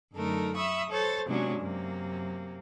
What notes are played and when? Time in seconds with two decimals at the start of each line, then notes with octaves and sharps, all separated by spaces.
0.14 F#2 D3 A3 D#4 A4 A#4
0.55 E5 B5 C#6 D#6 E6
0.90 A4 C5 C#5 A6
1.28 C3 F#3 G#3 B3 C#4 D4
1.60 F#2 C3 A#3